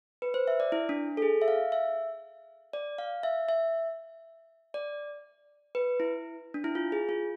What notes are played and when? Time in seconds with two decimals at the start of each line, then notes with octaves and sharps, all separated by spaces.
0.22 B4
0.34 C5
0.47 E5
0.60 D5
0.72 E4
0.89 D4
1.17 A4
1.22 G#4
1.42 E5
1.48 F5
1.72 E5
2.73 D5
2.98 F5
3.23 E5
3.49 E5
4.74 D5
5.75 B4
6.00 E4
6.54 D4
6.64 E4
6.75 F4
6.92 G#4
7.09 F4